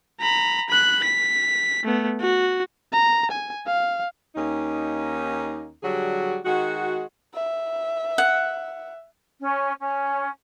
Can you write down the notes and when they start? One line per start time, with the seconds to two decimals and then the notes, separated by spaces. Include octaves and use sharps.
0.20 A#5 B5
0.69 B5 F#6
1.03 B6
1.84 A3 B3
2.20 F#4
2.92 A#5
3.31 G#5
3.66 F5
4.36 D#2 A#3 C#4 D#4
5.83 D3 F#3 G3 F#4 G#4
6.45 D#3 G#3 F#4
7.35 E5
8.18 F#5
9.40 C#4
9.80 C#4